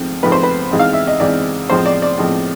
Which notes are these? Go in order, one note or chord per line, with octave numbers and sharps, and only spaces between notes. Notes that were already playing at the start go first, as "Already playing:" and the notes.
Already playing: G#2 F3 A3 C4
G#2 F3 A3 C4 B4
C5
B4
G#2 E3 G#3 C4
F5
E5
D#5
G#2 E3 G#3 C4 D5
A2 F3 G#3 C4 C5
D5
D5
A2 F3 G#3 C4